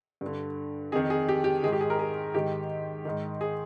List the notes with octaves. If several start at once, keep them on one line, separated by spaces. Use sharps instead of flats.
G2
D3
F2 D#3 G#4
G#4
G4
G4
G#2 D#3 G#4
G4
G#4
A#4
G#4
G#2 D#3 G4
G#2 D#3
G#4